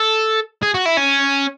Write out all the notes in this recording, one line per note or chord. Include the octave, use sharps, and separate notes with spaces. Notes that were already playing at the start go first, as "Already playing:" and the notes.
Already playing: A4
G#4
F#4
E4
C#4